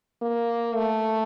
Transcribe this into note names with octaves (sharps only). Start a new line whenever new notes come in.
A#3
A3